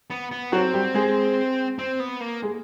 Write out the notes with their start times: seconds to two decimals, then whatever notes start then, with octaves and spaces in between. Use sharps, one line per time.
0.10 B3
0.31 B3
0.52 F#3 C4 F#4
0.73 G3 G4
0.94 G#3 G#4
1.79 C4
2.00 B3
2.21 A#3
2.42 G#3 G#4